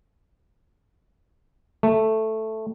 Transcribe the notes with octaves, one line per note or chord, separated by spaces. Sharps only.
A3